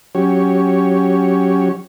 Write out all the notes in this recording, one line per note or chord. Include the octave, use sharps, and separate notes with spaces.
F#3 C#4 G4 C#5